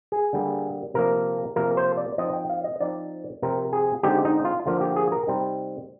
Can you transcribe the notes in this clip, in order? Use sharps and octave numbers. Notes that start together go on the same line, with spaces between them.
G#4
D3 G3 A#3
C3 F3 A#3 A#4
C3 F3 A#3 A#4
C5
D5
F3 C4 D#4 D#5
G5
F5
D#5
F3 C4 D#4 D5
C3 F3 C4 A#4
G#4
D3 G#3 C4 D#4 G4
D#4
F4
D3 F3 A#3 F4
G4
G#4
A#4
C3 G3 C4 D#4